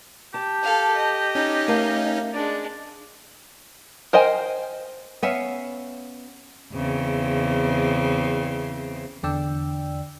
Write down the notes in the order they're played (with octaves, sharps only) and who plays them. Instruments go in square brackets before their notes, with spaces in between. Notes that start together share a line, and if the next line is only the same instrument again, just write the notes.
[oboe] G4 [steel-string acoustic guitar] A5
[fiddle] A4 F5
D#5
[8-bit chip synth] C#4 D#4
[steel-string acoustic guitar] A3 A#4 F5
[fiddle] G#3 D4 [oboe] D5
[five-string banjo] A#4 C5 D#5 G5 G#5
[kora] B3 C#4 E5 F5
[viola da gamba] E2 C#3 C4
[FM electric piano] E2 D3 D4 D5 G5 E6